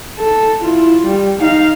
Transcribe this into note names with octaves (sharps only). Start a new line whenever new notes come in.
A4
E4 F4
G3
D#4 F5